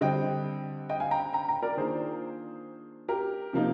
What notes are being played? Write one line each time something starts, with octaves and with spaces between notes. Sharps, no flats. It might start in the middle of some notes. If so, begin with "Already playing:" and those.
D3 G3 C4 D#5 G5
D#5 G5
F5 G#5
G5 A#5
G5 A#5
G5 A#5
A#4 D5
D#3 A#3 D4 F4 G#4 C5
G4 A#4
C3 F3 A#3 D#4